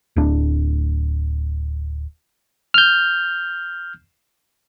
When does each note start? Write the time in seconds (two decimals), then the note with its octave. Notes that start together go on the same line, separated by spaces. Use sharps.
0.16 D1 D4
2.74 F6 G6